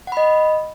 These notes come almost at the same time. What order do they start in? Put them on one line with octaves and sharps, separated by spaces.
F#5 B5 D#5